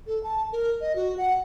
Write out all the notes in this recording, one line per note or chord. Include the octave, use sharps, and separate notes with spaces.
A4
A5
A#4
D#5
F#4
F#5